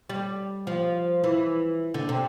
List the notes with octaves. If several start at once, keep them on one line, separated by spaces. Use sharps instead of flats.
G3
F3
E3
D3
C3